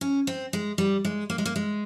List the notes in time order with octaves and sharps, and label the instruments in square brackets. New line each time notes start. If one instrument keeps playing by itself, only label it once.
[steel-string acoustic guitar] C#4
C4
G#3
G3
G#3
A#3
G#3
A#3
G#3